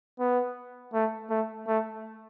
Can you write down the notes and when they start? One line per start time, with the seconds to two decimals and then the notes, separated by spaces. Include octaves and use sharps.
0.19 B3
0.93 A3
1.30 A3
1.67 A3